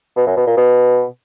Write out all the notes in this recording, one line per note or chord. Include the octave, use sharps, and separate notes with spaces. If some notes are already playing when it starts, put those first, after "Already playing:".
B2
F#2
B2
A#2
B2